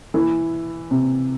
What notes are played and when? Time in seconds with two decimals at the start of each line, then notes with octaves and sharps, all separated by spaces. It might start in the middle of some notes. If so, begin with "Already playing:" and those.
0.14 E3
0.91 C3